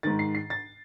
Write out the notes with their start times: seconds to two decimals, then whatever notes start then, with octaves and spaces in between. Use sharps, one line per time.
0.03 G#2 D#3 A6
0.19 C7
0.35 C7
0.50 A6